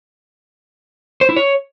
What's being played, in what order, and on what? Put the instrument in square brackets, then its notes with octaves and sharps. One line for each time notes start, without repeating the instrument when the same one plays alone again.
[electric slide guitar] C5
E4
C#5